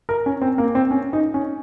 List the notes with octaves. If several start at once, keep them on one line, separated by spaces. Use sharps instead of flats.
A#4
C#4
C4
A#3
C4
C#4
D#4
C#4